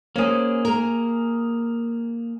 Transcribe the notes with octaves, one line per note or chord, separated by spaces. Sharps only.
A#3 C#4 G#4 C5
A#4